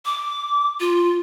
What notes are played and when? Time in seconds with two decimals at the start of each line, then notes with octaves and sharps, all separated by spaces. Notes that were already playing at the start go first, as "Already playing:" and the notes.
0.06 D6
0.80 F4